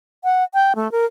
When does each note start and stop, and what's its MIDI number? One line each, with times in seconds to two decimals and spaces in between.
0.24 0.44 78
0.54 0.73 79
0.75 0.90 57
0.92 1.06 70